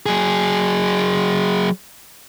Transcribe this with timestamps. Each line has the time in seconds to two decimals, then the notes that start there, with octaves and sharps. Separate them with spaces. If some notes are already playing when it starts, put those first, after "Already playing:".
0.06 F#3 G#4